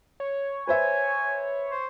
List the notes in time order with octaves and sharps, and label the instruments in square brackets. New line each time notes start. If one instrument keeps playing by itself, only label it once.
[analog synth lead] C#5
[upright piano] B4 C5 E5 [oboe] G#5
[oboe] C5